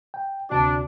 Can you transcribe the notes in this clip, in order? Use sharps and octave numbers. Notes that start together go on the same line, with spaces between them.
G5
D2 C3 D4 F#4